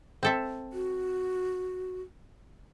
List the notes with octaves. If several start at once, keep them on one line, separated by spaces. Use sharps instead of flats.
C4 A4 E5
F#4